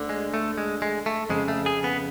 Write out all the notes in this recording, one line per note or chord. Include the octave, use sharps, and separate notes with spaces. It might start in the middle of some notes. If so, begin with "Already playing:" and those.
Already playing: D2 D3
G#3
A3
G#3
G#3
A3
F2 C#3 G#3
A3
G#4
B3